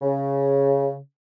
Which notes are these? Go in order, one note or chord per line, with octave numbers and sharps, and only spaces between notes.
C#3